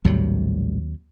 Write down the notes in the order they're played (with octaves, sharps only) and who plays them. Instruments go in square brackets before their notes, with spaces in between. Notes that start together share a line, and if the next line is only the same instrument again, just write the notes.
[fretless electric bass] A#1 A2 G3 [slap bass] D#2 C3 F#3